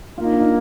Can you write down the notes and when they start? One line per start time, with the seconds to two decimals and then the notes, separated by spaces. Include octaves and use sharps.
0.18 A#3 F4
0.25 D#4
0.33 D4
0.40 D#4